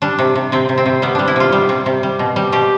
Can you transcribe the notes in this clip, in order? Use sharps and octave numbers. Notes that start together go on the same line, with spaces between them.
G3 D4
C3
C3
C3 C4
C3
C4
C3
G3 B3
G3 D4
E4
C3 F4
G3
C3
C3
G3
B2
G3
B2 G4